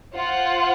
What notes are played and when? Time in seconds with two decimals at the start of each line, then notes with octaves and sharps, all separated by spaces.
0.15 F4 C5 F#5